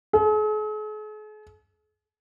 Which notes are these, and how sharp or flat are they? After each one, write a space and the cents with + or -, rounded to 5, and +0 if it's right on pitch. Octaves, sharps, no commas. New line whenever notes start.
G#4 +45